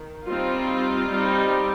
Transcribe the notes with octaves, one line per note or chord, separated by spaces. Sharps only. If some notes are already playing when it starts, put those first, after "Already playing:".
Already playing: D#3
G3 C4 D#4 F4
G3 C4 D#4